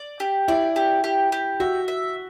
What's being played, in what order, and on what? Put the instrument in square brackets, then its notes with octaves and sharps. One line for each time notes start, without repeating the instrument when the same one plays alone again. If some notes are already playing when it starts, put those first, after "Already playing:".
Already playing: [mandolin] D5
G4
[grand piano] E4 [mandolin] D5
[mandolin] G4
G4
G4
[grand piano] F#4 [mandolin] E5
[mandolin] E5